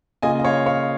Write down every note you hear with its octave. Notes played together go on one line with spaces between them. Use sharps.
C#3 A#3 F4 D#5 G#5
D#5
C#5 F5
C#5 F5